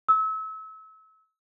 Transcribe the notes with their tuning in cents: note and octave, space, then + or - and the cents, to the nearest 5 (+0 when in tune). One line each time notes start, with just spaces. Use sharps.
E6 -30